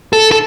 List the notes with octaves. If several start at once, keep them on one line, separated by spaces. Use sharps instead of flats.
A4
A4